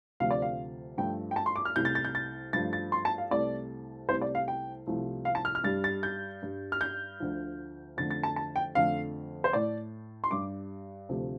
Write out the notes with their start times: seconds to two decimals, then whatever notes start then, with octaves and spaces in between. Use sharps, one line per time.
0.20 D2 C3 F3 A3 F5
0.31 D5
0.42 F5
0.98 G2 F3 A3 G5
1.31 G5
1.36 A5
1.46 C6
1.56 D6
1.65 F6
1.75 C2 C3 A3 G6
1.85 A6
1.95 A6
2.05 G6
2.15 A6
2.53 G2 F3 A3 A6
2.73 A6
2.92 C6
3.05 A5
3.18 F5
3.31 C2 C3 A3 D5
4.09 C2 C3 A3 C5
4.22 D5
4.35 F5
4.48 G5
4.87 C2 C3 F3 A3
5.25 F5
5.35 A5
5.45 F6
5.55 F6
5.64 G2 G3 A6
5.84 A6
6.03 G6
6.43 G2 G3
6.72 F6
6.81 G6
7.20 D2 D3 F3
7.97 F2 D3 A3 A6
8.11 A6
8.23 A5
8.36 A5
8.56 G5
8.75 F2 D3 F3 A3 F5
9.44 C5
9.53 A2 A3 D5
10.24 C6
10.31 G2 G3 D6
11.09 D2 C3 F3 A3